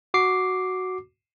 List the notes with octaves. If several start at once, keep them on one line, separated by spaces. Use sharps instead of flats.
F#4 D6 C7